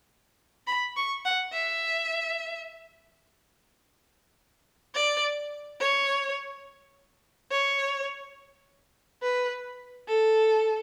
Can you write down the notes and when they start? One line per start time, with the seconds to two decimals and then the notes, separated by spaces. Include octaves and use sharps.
0.67 B5
0.96 C#6
1.25 F#5
1.52 E5
4.94 D5
5.80 C#5
7.51 C#5
9.22 B4
10.08 A4